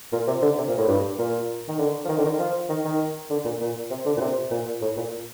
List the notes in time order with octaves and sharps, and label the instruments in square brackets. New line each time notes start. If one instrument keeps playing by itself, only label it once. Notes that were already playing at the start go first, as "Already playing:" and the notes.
[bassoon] A#2
C3
D3
C3
A#2
A2
G2
A#2
D#3
D3
F3
D#3
D3
D#3
F3
D#3
D#3
D3
A#2
A#2
C3
D3
A#2
C3
A#2
A2
A#2